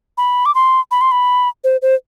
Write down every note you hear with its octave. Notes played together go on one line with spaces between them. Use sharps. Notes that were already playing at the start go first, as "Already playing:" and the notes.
B5
D6
C6
B5
C6
B5
C5
C5